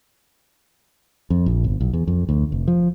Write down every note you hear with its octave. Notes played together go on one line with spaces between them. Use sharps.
F2
A#1
G1
B1
E2
F2
D2
F1
F3